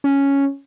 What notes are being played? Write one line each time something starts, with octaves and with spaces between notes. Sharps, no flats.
C#4